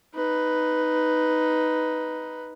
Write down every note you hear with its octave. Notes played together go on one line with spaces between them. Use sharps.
D#4 B4